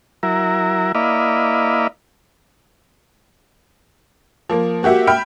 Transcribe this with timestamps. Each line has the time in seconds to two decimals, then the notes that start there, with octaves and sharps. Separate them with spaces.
0.23 F#3 E4 A#4
0.95 A#3 E4 D5 D#5 F5 B5
4.49 F3 A#3
4.83 A#3 F#4 G4 E5 F#5
5.07 E5 G5 B5 F6